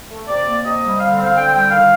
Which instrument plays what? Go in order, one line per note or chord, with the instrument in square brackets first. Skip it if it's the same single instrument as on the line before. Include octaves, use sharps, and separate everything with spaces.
[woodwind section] A3
C3 D5
A#3
C3 D#5
G3
D3 F5
C4
F5
D3 G5
G3 G5
D#3 F5